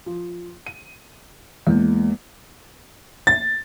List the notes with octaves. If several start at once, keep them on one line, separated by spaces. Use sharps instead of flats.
F3
D#7
E2 G#3 A#3
A6